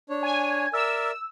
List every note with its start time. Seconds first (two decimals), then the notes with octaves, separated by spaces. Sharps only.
0.09 D4 C#5
0.23 G#5
0.73 A#4 D5 E5 E6